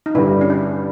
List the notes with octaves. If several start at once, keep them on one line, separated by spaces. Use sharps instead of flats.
D#4
G2 D3 G3 E4
C#4
D4